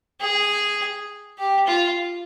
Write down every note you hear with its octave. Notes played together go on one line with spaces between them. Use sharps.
G#4
G4
F4